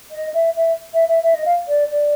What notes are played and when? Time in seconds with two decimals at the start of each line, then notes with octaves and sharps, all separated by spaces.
0.12 D#5
0.34 E5
0.56 E5
0.94 E5
1.09 E5
1.23 E5
1.34 D#5
1.46 F5
1.68 D5
1.91 D5